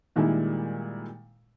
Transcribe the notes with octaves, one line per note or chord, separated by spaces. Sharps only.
A#2 D#3 G3 G#3 E4